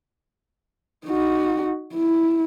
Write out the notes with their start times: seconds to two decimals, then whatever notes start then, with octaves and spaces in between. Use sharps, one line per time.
1.07 D#4 F#4
1.94 E4